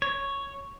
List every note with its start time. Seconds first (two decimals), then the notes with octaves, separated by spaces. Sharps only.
0.02 C#5